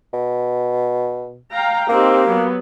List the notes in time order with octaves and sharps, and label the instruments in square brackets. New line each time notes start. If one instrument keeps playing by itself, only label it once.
[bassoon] B2
[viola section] F5 G5 A#5
[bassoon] A#3 [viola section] C4 D#4 G4
[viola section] F#3 B3